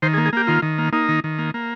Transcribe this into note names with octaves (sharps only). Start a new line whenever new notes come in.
D#3 C5
G#4
A#3
G#4
A#3 G4
D#3 F4
D#3
A#3
A#3 D#4
D#3
D#3
A#3
A#3